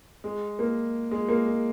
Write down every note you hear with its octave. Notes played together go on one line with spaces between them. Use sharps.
G#3
A#3
G#3
A#3
G#3